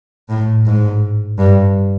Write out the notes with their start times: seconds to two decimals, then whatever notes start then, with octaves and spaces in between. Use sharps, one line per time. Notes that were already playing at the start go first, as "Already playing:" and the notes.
0.29 A2
0.66 G#2
1.39 G2